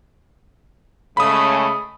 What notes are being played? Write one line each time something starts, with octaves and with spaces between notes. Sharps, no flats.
C#3 G#3 A3 B5 D#6